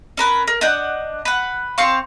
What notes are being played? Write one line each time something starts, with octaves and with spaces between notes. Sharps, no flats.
C#4 A#4 B4
A#4
D4 D#5 F#5 G6
B4 F#5
C4 F5 C6 C#6